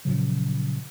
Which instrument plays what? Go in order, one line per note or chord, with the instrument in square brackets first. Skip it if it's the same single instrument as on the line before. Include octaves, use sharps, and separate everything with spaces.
[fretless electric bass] A#2 C#3 F3 F#3